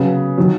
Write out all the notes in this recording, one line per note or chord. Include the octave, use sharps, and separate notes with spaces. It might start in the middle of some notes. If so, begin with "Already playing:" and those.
Already playing: C#3 F#3 B3
D#3 F#3